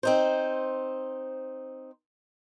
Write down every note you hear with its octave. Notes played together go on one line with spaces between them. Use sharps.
C4 D#4 C5